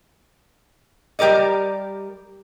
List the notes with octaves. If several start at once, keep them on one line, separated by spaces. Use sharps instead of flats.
G3 G4 A#4 D5 D#5